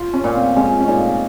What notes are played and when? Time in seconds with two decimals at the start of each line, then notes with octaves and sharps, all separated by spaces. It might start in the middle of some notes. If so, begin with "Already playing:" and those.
Already playing: F4
0.14 C#4
0.24 A#2
0.35 C4
0.56 G#3 C#4
0.81 C#4
0.87 A#2 D#4